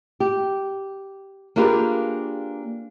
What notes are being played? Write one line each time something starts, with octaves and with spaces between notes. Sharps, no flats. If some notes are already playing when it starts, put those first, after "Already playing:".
G4
A#3 D4 F4 G4 G#4 B4